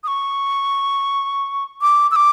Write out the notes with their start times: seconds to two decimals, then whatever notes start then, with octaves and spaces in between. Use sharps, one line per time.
0.04 D#6
0.08 C#6
1.82 D6
2.11 E6
2.16 D6